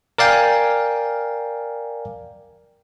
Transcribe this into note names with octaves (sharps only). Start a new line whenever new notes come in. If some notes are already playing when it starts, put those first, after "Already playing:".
A#4 D5 F5 G5 G#5